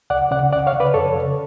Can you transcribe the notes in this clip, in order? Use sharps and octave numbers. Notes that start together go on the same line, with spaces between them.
C#2 D5 F#5
C#3 D5 F#5
C#2 D5 F#5
C#5 F5
C#3
B4 D5
F2 A4 C#5
C#3